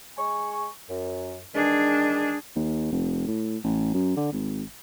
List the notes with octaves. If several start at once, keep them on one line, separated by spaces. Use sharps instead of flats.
G#3 G#5 C#6
F#2
D#3 E3 G#3 D4 G#4
D#2
F1
A2
A1
F#2
D3
G#1